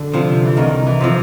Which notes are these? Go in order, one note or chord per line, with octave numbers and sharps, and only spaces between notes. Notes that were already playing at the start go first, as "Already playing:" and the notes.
Already playing: D3
C3 F3
E3
C2 D#3
E3
C3 F3